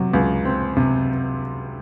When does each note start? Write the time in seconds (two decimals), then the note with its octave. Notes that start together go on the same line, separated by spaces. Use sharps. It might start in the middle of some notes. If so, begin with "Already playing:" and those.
Already playing: C3 F#3
0.14 C#2
0.45 C4
0.77 C3